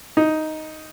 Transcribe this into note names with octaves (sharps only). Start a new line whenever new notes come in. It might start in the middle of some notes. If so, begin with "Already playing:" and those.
D#4